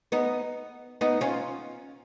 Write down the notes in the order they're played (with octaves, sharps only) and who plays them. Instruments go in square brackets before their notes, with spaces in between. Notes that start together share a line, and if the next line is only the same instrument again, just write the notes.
[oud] B3 D#4
B3 D#4
C#4 F4